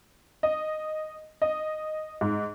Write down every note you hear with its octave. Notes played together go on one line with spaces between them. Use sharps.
D#5
D#5
G#2